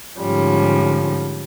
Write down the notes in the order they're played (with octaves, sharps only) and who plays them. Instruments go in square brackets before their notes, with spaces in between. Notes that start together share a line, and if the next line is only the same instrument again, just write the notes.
[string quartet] G#2 D3 F3 G3 C#4